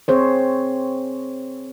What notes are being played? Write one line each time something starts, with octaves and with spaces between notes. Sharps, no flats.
C4 G#4 C5 C#5